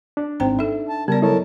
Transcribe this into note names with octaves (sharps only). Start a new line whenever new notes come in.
D4
G#1 G#2 C4 C5 G5 A#5
D#4 A4 E5
A5
C#3 G3 B3 A#4 D5 A5
F#3 E4 A4 A#4 C#5 A5